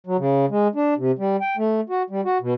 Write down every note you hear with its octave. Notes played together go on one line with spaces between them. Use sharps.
F#3
C#3
G#3
D4
C3
G3
G5
A3
F#4
G3
F#4
B2